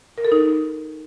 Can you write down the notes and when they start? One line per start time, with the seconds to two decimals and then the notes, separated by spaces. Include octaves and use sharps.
0.18 A#4
0.25 A4
0.32 D#4